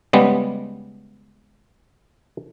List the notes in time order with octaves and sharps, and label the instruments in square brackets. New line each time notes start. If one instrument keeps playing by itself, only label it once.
[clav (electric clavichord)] C#3 G3 G#3 B3